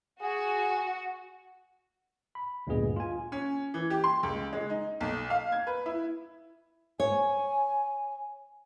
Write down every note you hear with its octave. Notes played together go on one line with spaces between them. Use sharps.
F#4 G#4
B5
D2 G2 A#2 B3 G#4 D#5
F4 G#5
C#4
E3
G4
C6
C#2
G#3
D#4
B1
F5
G#6
B4
E4
C#5 G#5